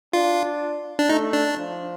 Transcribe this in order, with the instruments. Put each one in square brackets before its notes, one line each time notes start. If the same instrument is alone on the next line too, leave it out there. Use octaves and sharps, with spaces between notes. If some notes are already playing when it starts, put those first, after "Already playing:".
[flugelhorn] D4 [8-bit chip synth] F4
[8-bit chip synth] D4
[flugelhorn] A3 [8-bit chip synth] D#4
[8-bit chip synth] D4
[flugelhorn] F3